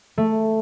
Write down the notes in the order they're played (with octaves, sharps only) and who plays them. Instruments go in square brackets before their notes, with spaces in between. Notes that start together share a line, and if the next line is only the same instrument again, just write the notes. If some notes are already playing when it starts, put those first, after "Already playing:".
[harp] A3